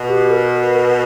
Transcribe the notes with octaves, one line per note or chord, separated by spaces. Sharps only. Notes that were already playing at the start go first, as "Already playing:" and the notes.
Already playing: B2
G4
A#4
A#4